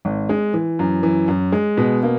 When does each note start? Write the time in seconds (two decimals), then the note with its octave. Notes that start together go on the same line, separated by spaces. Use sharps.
0.05 G#1
0.29 G#3
0.54 E3
0.79 F#2
1.03 E3
1.28 F#2
1.52 G#3
1.77 B2
2.03 A#3